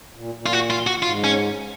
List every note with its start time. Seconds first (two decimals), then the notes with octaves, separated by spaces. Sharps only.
0.15 A#2
0.36 A#2
0.46 F4
0.53 F#4
0.70 F4
0.87 F#4
1.03 G#2 F4
1.24 C#4